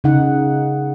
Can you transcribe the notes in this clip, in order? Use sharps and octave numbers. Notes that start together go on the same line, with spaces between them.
C#3 D#4 F#5